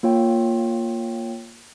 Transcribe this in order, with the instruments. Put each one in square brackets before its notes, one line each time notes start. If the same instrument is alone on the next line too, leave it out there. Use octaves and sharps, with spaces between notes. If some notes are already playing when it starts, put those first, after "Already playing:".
[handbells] A#3 F4 C#5 G5